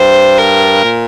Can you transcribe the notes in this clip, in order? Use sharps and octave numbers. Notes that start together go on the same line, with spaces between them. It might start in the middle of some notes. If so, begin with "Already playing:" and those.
Already playing: G2 C5
A#4
A#2